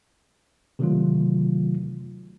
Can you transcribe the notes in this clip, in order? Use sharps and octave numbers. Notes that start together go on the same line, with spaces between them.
C3 D#3 E3 F#3 A3 F4